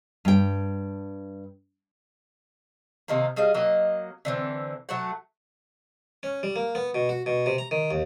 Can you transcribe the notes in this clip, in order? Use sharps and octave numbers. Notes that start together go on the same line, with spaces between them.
G2 G5
C3 D#3 A#3
G3 G#4 D#5 F5
F#3 A#3 D#5
D3 E3 C4
F#3 A3 F#5
C#4
G3
A#3
B3
B2
F#4
B2
C3
A#5
D#3
D#2